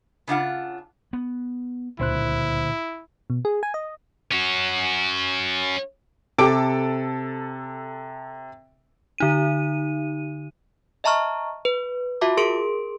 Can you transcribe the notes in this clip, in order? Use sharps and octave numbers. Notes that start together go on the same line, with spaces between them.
C#3 D4 F4 F#5
B3
D1 C#2 A#2 D3 E4 C5 F#6
B2
G#4
G#5
D#5
C#4 F#4
C3 G4 A4 D6 D7
D3 D#4 D#7
D#5 E5 A5 A#5 C#6 F6
B4
F4 F#4 E5 A5 D6
G#4 A#4 C6 D7